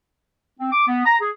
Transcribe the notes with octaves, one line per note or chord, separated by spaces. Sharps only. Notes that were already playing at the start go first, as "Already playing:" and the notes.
C4
D6
B3
A#5
G#4